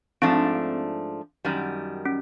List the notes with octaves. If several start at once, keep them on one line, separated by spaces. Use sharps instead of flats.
G#2 F3 A3 C4 D4
F#2 D#3 G3
C#4